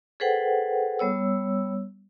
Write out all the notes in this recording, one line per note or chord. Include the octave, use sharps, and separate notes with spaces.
G#4 A4 B4 C5 F#5 G5
G3 B3 C#5 E6